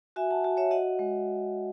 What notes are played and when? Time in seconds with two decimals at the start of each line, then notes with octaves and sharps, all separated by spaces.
0.16 F#4 E5 G#5
0.31 F#5 A5
0.44 F#4
0.57 C#5 E5
0.71 F#4 D#5 F#5
0.99 G#3